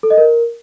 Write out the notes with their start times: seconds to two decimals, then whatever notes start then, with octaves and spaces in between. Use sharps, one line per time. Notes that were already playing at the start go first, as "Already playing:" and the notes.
0.03 A4
0.10 D#5
0.18 A#4